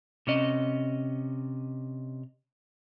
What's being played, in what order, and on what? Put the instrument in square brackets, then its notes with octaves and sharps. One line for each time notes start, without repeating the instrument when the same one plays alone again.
[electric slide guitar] C3 C#4 D#5